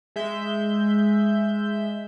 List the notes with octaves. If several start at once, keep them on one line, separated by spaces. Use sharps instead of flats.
G#3 E5 G6